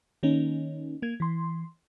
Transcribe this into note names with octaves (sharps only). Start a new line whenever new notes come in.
D#3 A#3 C#4 D#4
A#3 G#6
E3 C6